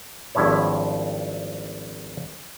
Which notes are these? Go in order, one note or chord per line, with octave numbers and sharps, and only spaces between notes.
G#1 G2 F3 E4 C#5